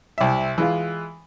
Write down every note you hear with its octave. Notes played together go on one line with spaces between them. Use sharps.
C2 E5
E3 G#3 F4